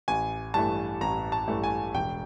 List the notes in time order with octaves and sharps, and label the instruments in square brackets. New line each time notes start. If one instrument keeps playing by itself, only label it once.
[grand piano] A1 G#5
G2 E3 A3 A5
A1 A#5
A5
G2 E3 A3
G#5
E1 G5